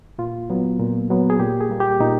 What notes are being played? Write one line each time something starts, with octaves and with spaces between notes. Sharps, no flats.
A#2 F4
F#3 B3
A#2
F#3 B3
G#4
A#2 G4
G#4
G3 A#3
G4
A#2 D#4